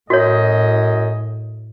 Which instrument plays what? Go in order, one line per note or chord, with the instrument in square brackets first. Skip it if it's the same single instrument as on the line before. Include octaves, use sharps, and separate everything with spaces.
[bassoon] F#2 [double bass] A2 [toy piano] F#4 C#5 [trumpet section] D#5